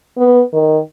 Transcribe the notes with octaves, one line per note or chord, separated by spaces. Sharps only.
B3
D#3